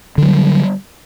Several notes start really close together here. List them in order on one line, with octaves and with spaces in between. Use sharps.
D3 F#3 G3